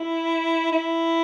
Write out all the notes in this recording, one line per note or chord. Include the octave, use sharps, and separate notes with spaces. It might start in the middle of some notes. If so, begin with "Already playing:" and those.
Already playing: E4
E4